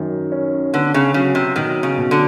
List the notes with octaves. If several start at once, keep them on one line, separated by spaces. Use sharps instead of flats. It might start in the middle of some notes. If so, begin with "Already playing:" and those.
Already playing: F#2 D#3
C#4
D3 B3
C#3
C#3 F#3
C3
B2 D#3
C#3
B2
D3